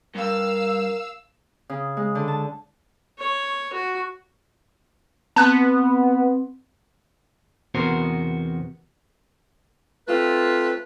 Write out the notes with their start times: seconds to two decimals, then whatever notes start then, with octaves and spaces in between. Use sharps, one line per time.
0.15 G2 A#4 F5 E6
1.69 C#3
1.97 G#3
2.15 D3
2.28 A5
3.19 C#5
3.73 F#4
5.36 B3 C4 A5 F#6
7.74 E2 C3 B3 F#4 A#4 C5
10.07 A3 C4 F4 B4